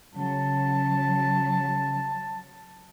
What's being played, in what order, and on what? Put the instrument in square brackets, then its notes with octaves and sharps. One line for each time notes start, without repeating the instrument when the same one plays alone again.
[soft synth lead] C#3 [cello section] F#3 [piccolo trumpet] A5